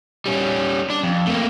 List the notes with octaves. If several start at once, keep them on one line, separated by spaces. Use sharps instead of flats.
G3 C#4
D4
F2
A3 A#3